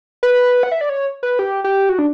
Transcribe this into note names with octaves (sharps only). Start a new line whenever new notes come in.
B4
F#5
E5
D5
C#5
B4
G4
G4
F#4
D4